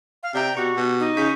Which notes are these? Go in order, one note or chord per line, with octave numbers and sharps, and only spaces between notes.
F5
C3 D5 G5 A#5
B2 F#4 G4 C#6
B2
D#4
C#3 C#6 G6 B6